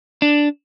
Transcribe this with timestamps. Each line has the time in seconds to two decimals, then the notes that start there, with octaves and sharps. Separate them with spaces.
0.22 D4